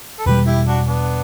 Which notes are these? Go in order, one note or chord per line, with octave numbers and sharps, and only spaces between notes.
A4
E2 B2 G3 G4 B4
E4 G4
D4 F#4
B3 D4